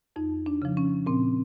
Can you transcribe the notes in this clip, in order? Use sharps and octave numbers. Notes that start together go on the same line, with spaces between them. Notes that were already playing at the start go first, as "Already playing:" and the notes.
F2 D#4
D4
C#3 F3
C#4
A#2 C4